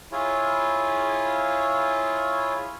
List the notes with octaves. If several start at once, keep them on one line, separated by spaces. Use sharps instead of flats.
E4 F4 G#4 C#5